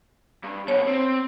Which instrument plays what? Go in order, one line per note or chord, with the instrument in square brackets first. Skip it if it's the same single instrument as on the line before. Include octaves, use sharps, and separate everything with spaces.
[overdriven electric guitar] G2
[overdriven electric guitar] C2 B2 [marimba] C#5
[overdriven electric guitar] C4